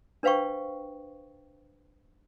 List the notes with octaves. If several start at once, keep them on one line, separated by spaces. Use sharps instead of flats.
D4 B4 C5 F5 G5 C#6